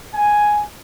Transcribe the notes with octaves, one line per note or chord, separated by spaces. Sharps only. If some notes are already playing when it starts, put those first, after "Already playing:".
G#5